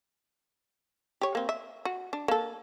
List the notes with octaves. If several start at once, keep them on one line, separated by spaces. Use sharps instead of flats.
G4 C#5
A#3 C4
E5
F#4
D4
A#3 A4